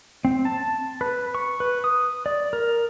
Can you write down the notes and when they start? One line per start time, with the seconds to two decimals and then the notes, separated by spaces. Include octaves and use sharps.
0.25 C4
0.45 A5
1.01 B4
1.35 C#6
1.60 B4
1.84 D#6
2.26 D5
2.53 A#4